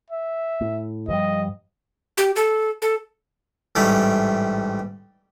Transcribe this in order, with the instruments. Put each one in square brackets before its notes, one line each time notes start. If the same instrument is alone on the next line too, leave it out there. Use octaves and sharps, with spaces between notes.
[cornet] E5
[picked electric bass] A2
[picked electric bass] G2 F3 G3 [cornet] D#5
[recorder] G4
A4
A4
[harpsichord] A1 G#2 G3 A3 G5